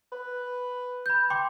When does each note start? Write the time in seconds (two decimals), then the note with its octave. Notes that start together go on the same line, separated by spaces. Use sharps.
0.12 B4
1.06 B5 G6
1.30 G5 C6 D6